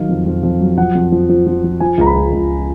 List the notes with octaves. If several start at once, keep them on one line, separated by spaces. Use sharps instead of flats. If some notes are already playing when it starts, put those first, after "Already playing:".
Already playing: D#3 F#3 F5
F2
F2
F2
F#3
F3 F#5
F2
F3
F3
F3
F3
F3 G#5
C#2 A#5
B5
C#2
C#2